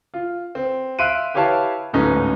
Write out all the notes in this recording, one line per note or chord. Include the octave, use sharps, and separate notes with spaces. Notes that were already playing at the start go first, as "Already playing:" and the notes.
F4
C4
E5 F5 C6 F#6 D7 D#7
E4 G4 B4 C#5 F5 A5
D1 G#2 A3 B3 C#4 D#4